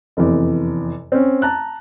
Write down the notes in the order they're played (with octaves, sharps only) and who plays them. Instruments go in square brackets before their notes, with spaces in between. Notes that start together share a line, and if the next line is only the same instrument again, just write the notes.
[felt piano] F1 E2
C4 C#4
A5 A#5 F#6